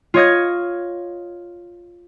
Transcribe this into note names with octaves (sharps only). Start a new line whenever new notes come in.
F4 C#5 D#5 G#6